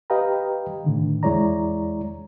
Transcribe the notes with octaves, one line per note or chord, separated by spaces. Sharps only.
G4 B4 D#5 F5 G5 A#5
A2 D3 D#3
E2 G#3 E4 C#5 D5 A#5